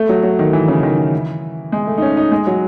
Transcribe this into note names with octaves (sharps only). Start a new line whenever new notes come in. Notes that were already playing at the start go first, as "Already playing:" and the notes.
Already playing: A3
F#3
F#3
D#3
E3
C#3
D#3
E3
G#3
A3
D#4
C#4
D#4
G#3
F#3